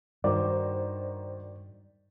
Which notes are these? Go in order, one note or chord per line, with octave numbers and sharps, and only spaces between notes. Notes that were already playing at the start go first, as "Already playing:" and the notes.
G2 D#3 F#4 C5 D5